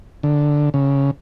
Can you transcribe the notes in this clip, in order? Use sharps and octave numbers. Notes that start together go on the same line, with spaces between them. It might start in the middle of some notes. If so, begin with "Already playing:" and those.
D3
C#3